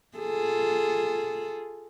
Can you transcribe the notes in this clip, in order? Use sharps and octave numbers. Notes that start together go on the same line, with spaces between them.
F4 G#4 A4